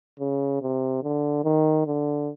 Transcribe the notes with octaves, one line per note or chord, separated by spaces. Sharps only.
C#3
C3
D3
D#3
D3